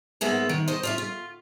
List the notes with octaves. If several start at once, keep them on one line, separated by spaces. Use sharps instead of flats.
G#2 G#3 A#3 B3 E5
D#3
C5 D#5
F4 D5 E5
F4